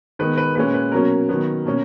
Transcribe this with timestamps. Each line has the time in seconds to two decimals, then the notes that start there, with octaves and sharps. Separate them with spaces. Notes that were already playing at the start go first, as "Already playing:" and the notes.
0.19 D#3 G#3 B3 B4
0.38 B4
0.55 A#2 G#3 C#4 B4
0.74 B4
0.92 B2 F#3 A#3 C#4 A#4
1.29 D#3 F#3 B3
1.65 B2 A#3 C#4